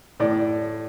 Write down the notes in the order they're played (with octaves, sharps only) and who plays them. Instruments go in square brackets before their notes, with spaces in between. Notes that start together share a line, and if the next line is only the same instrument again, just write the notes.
[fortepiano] A2 D5